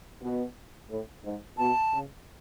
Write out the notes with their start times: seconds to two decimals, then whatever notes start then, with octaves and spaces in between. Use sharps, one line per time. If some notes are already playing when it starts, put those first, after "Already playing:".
0.21 B2
0.88 A2
1.23 G#2
1.57 B2 A5
1.91 C#3